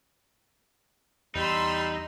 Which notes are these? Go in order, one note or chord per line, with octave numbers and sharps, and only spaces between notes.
E2 G3 D#4 B5 C6 E6